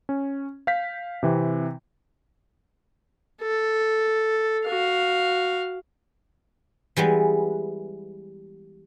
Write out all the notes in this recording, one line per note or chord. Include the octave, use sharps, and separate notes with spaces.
C#4
F5 G6 B6
C3 E3 C4
A4
F#4 F5
E3 G3 G#3 B3